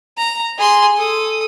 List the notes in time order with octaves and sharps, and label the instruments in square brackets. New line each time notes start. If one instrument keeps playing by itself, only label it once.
[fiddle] A#5
G#4 C6
A4 D#6